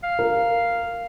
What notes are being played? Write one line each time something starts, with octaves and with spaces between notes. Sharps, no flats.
F5
A#4